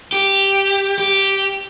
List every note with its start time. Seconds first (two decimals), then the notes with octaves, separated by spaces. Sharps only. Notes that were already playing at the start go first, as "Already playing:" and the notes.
0.12 G4
0.98 G4